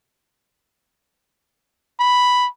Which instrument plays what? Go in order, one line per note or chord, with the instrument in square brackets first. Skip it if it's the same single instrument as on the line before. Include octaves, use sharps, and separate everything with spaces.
[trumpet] B5